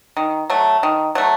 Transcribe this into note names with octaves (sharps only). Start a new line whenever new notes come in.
D#3
F#3 A3
D#3
F#3 A3